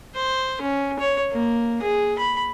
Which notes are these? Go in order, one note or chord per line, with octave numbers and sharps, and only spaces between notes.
C5
C#4
C#5
A#3
G#4
B5